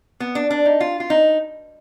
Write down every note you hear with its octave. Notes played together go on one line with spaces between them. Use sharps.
B3
D4
D4
D#4
F4
F4
D#4